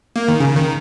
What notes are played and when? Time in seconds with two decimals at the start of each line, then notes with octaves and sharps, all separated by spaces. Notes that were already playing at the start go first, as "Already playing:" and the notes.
0.16 A#3
0.28 D#3
0.40 C#3
0.56 D#3